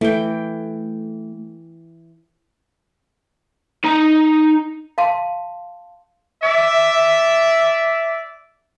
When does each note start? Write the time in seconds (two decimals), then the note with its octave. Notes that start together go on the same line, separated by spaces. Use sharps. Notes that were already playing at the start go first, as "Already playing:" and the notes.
0.01 E3 A3 G5
3.84 D#4 A#5
4.98 F5 A5 C6
6.42 D5 E5